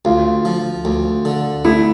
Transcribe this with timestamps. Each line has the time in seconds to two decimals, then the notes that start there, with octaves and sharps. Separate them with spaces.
0.05 D2 F4
0.45 F3
0.85 D2
1.25 D3
1.65 A3 E4